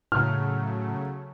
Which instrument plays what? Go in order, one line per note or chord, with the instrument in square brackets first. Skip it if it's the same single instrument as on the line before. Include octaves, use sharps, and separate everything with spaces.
[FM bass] A2 [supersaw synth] C#3 F#3 A3 [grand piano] F6